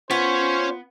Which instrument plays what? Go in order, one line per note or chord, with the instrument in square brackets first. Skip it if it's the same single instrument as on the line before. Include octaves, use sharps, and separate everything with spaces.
[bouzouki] B3 [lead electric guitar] C#4 C#5 [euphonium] F4 [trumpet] C5